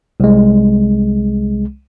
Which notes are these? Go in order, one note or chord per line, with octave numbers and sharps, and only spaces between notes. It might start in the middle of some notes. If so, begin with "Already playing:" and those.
C2 G#3